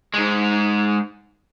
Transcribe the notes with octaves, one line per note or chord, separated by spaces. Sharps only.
G#2 G#3